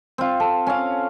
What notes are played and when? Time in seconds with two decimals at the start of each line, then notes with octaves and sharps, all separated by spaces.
0.18 C4 F4
0.40 A4
0.67 C#4 F5